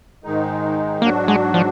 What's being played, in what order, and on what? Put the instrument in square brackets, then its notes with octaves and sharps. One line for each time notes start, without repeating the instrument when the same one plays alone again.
[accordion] G#2 D#3 G#3 D#4
[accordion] G#2 F#3 D4 F#4 [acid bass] A#3
[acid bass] G#3
F3